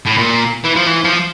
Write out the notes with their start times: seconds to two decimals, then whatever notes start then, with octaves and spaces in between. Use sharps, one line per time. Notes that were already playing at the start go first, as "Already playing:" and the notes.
0.06 A2
0.18 A#2
0.64 E3
0.76 F3
0.87 E3
1.04 F3